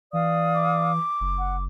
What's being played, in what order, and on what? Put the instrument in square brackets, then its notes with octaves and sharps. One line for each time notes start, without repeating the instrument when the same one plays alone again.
[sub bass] E3 [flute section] D5 F5 D#6
[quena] D6
[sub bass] F#1
[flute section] F#5